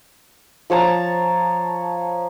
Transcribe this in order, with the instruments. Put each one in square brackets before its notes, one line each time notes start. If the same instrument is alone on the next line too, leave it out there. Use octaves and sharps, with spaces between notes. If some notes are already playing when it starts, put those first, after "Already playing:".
[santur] F3 C#5 A5 A#5